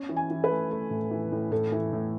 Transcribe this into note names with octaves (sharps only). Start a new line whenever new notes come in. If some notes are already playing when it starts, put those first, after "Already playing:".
Already playing: C#4
E3
G#5
E3
B4
A3
A3 A4
A2
E3
A2
A2 A4
E3
A2